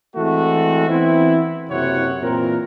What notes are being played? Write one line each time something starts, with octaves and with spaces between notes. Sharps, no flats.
E3 G#3 A3 C4 F#4
E3 B3 C4 E4
F#1 F#2 C3 E4 C#5 F#5
A#2 E3 C4 A#4